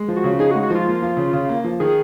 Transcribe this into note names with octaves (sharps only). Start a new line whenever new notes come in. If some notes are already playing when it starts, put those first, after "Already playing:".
Already playing: G#3
F3
F#4
C#3
D#4 G#4
F#4
G#3
F#4
F3 F4
A#3
F3
C#3
C#3
A#3
F3
D#3 G#4